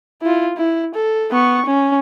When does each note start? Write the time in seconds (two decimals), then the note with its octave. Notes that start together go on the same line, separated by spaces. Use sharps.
0.22 E4 F4
0.57 E4
0.94 A4
1.31 B3 C#6
1.66 C#4